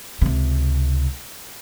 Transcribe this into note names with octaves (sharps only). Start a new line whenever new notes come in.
C#2 C3